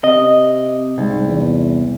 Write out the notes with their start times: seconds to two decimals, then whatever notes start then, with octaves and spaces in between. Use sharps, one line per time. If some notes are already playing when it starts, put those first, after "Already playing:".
0.04 C3 D#5
0.98 C2 G#2
1.28 E2